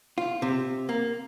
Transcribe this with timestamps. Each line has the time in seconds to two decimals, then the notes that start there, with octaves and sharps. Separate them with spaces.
0.18 F4
0.42 C3
0.89 A#3